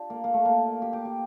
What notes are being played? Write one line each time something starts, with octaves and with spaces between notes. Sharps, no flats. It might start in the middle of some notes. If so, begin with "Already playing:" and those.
Already playing: D4 F4 G4
A#3
A#3
A3
A#3
G4
G4
G4